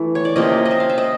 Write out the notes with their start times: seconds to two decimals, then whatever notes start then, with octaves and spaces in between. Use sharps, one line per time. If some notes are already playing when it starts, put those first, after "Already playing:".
Already playing: E3 A3
0.15 C#5
0.25 D5
0.36 C3 F3 A#3 C#4 D#5
0.65 D#5
0.71 E5
0.80 F5
0.89 E5
0.98 D#5